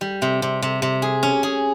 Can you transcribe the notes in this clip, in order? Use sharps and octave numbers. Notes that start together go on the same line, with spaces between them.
G3
C3
C3
C3
C3
G#4
C#4
G#4